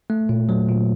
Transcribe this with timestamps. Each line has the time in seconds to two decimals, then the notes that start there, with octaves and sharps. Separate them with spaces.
0.10 A3
0.29 A#2
0.49 F#3
0.69 A#2